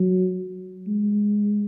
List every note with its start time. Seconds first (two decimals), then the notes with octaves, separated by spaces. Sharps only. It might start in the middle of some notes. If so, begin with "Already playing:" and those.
Already playing: F#3
0.88 G#3